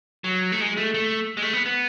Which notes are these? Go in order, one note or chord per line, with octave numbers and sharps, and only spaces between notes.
F#3
A3
G#3
A3
A3
G#3
A3
B3
B3